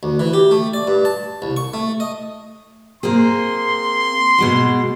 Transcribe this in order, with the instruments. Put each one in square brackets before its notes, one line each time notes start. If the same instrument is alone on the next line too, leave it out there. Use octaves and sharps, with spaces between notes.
[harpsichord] D2
E3
G4
A3
D5
G2
A5
C2
C#6
A3
D#5
[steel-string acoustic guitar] A#3 C4 G#4 [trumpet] C6
[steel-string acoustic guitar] B2 G#3 F#4